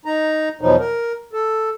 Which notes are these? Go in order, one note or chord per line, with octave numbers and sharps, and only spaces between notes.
D#4 A#5
E2 B2 F3 F#3 D#4
A#4
A4